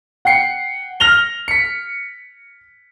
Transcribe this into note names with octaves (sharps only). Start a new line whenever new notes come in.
F#5 G5 C7 C#7
F6 A#6 F7 G7
B6 C#7